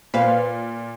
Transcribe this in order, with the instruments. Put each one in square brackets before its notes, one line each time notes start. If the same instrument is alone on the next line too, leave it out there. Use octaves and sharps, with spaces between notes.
[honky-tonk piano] A#2 [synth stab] B4 C5 F5